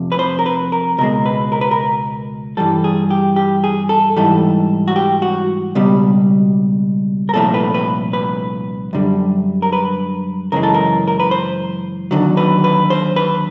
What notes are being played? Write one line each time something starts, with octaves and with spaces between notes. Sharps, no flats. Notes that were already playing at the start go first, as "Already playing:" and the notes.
Already playing: F2 C3 F3 A3
B4
C5
A#4
B4
A#4
C#2 B2 G#3 A#4
B4
A#4
B4
A#4
G2 E3 G3 A4
G#4
G4
G4
G#4
A4
G#2 E3 G3 A4
F#4
G4
F#4
C#2 B2 G3
A#4
C2 A#2 F3 A3 A4
B4
B4
B4
F#2 D3 G3
A#4
B4
F#2 C#3 E3 G#3 A#4
A4
A#4
A#4
B4
C5
D#2 D3 F#3
B4
B4
C5
B4